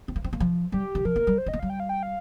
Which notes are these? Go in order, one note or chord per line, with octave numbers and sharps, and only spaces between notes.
C4
A#3
C4
A#3
F3
G3 G4
D#3
F3 A#4
A#3
G3
C5
C4 D#5
A#3
G3 F5
G5
F5
G5
F5